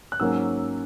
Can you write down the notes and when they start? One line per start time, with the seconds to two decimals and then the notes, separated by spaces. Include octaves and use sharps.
0.12 F#6
0.20 G#2 F#3 A#3 C#4 E6